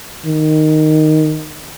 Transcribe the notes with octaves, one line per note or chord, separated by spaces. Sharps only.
D#3